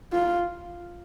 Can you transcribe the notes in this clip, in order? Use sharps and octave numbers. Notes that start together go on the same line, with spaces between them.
F4